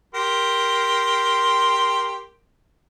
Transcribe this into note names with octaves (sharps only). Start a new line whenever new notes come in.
G4 A#4 C6